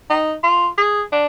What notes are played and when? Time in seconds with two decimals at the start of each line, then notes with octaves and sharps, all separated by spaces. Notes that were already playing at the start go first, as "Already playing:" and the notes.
0.10 D#4
0.44 F4
0.78 G#4
1.12 D4